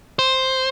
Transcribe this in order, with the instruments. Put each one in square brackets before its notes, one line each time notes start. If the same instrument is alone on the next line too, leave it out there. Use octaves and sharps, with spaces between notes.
[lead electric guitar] C5